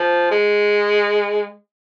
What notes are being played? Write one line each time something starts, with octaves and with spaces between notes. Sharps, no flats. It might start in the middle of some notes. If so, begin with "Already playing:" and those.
Already playing: F3
G#3